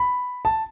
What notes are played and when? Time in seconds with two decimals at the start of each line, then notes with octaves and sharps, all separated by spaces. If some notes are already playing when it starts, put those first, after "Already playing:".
Already playing: B5
0.45 A5